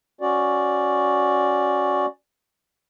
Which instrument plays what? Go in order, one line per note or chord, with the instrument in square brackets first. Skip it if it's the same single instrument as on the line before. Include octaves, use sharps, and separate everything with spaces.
[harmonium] C#4 F#4 D5